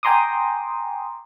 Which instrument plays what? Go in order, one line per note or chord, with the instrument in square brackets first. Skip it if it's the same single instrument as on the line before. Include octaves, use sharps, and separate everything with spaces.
[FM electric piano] G5 G#5 A#5 C6 D6 D#6